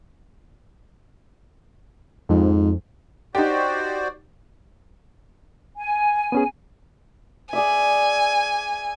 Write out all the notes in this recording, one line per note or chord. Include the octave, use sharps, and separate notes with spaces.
F2 G#2
D#4 F#4 G4 C5 D5
G#5
B3 C#4 G#4
G#4 D5 E5 G#5